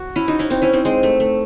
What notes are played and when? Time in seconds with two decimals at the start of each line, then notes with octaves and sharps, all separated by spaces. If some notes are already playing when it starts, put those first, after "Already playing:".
Already playing: F#4
0.16 C#4 E4
0.28 D#4 F#4
0.39 C#4 E4
0.50 C4 D#4
0.62 C#4 E4
0.73 C4 D#4
0.85 G#3 C4
1.03 A3
1.20 A3